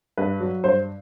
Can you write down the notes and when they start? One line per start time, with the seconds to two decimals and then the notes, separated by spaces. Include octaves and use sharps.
0.18 G2 B4
0.40 F#3
0.64 G2 C5